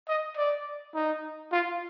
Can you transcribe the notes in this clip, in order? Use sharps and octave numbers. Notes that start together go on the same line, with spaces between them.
D#5
D5
D#4
F4